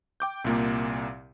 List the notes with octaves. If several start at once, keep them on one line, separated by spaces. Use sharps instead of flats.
G5 D6 G6
C2 A#2 A#3